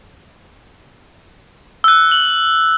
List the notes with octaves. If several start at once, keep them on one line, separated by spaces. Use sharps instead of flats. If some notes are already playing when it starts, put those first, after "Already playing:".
E6 F#6
F#7